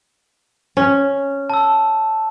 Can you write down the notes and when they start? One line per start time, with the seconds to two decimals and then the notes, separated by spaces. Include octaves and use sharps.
0.77 C#4
1.50 A5 E6